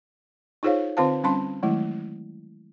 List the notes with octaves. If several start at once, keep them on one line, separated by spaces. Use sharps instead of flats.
D#4 F4 G#4 C5 C#5 F5
D3 C4 F4 C5 F5 A5
G3 C4 C#4 A5 C6
D#3 F#3 G#3 A3 E4